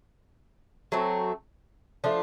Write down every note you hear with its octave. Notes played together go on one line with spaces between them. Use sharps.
F#3 A3 C4
F3 A3 D4 F4